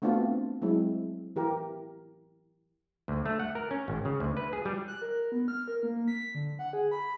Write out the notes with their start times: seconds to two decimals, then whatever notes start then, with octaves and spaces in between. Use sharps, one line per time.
0.02 A3 B3 C4 D4 F4 F#4
0.62 F#3 G#3 C4 E4
1.36 E3 G4 A#4
3.08 D2
3.26 A3
3.40 F#5
3.55 A#4
3.71 C#4
3.88 G#1
4.05 C#3
4.20 D2
4.37 B4
4.53 G#4
4.65 G3
4.87 F#6
5.02 A#4
5.32 B3
5.48 F6
5.68 A#4
5.83 A#3
6.08 B6
6.35 D3
6.59 F#5
6.73 G#4
6.91 B5